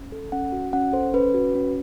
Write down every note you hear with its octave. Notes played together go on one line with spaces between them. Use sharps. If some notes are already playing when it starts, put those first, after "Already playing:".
Already playing: C#4
A4
C#4 F#5
F#4
C#4 F#5
A4 C5
C#4 B4
F#4
C#4